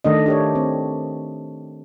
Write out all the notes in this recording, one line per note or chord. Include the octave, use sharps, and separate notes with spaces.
D#3 A3 D4 D#5
D4 G4 C#5
C4